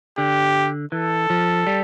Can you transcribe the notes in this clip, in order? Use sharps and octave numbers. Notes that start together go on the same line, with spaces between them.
D3 G4
E3 A4
F3
G3